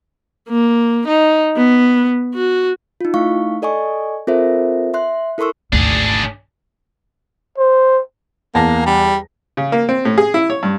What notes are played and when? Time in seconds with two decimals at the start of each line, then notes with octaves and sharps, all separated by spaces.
0.49 A#3
1.07 D#4
1.57 B3
2.34 F#4
3.01 D#4 F4
3.14 A3 D#4 E4 F5 C#6
3.62 A4 D5 D#5 G#5 C#6
4.27 C4 F4 A4 A#4 C5 E5
4.94 E5 C6 F#6
5.38 E4 A4 A#4 C6 C#6 E6
5.73 G#1 D2 D4 G#4
7.58 C5
8.55 E2 A#3 A5 A#6
8.86 G3
9.57 C#3
9.72 A#3
9.89 C4
10.05 A2
10.18 G#4
10.34 E4
10.50 C#5
10.63 G2